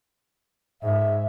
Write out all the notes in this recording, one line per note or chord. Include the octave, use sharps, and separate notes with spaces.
G#2 E5